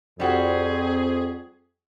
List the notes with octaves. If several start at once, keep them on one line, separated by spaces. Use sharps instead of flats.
F2 G3 C4 F4 F#4 G#4